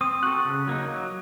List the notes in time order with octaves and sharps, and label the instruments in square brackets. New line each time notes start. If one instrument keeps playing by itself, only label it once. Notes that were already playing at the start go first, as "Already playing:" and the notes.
[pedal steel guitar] C4 [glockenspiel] D#6 D#7
[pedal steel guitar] F#4 A4 [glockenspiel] F#6 F#7
[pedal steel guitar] C#3
F#3 A#3 D#4
F#3